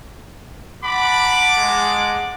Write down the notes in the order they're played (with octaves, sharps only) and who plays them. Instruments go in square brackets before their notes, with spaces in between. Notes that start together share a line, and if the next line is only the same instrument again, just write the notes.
[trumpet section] F#5 A5 D6 [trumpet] B5
[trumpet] G#3